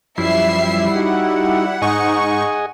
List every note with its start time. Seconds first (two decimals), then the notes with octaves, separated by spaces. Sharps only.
0.18 F#2 F3 G3 E4 E5 C7
0.96 D#4 F#4 G4 F#5
1.82 G#2 D#4 G#4 D#5 G#5 C#6